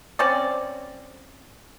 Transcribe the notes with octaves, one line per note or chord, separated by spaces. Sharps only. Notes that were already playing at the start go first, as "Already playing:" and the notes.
C4 C#4 D5